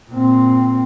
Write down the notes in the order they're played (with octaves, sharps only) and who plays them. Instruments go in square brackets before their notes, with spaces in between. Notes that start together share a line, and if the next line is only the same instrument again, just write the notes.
[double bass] A#2 C4